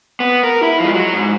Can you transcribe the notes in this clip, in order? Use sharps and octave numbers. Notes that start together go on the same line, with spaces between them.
B3
A#4
E4
F3 G#3
F#3
G#2